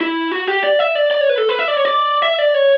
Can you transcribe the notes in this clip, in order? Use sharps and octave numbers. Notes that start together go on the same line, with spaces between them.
E4
F#4
G4
D5
E5
D5
D5
C#5
B4
A4
B4
E5
D5
C#5
D5
E5
D5
C#5